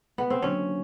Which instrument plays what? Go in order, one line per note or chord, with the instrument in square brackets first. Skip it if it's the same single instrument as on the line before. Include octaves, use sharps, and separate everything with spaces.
[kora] B3
C4
[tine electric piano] D3 F#3 A#3 D4 F#4 [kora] C#4